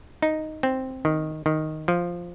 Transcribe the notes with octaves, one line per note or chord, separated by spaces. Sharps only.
D#4
C4
D#3
D#3
F3